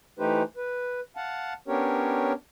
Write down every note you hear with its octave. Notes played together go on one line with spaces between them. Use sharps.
E3 A3 D#4 G4 B4 C5
B4
F5 F#5 A5
B3 C#4 D4 G4 A#4 C#5